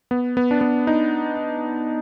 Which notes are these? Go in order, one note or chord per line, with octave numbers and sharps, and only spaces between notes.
B3
B3
D4
B3
D#4